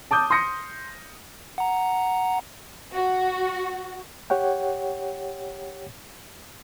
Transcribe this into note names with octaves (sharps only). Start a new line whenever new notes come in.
A5 D6 D#6 G6
C6 D#6 G6 A#6 C#7
F#5 A#5
F#4
G4 C#5 F#5 G5